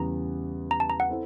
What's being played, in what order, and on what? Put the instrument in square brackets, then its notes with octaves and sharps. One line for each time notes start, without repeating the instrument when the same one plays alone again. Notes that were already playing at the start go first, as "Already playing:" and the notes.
Already playing: [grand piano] E2 C#3 E3 G3 B3 [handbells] A#5
[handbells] A#5
A5
A#5
F#5
[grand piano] C4 E4 A4